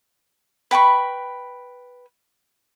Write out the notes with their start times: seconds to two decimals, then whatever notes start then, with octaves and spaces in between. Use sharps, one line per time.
0.71 B4 G5 B5 C#6